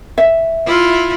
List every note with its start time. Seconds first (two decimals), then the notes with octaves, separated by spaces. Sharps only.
0.18 E5
0.66 E4 F4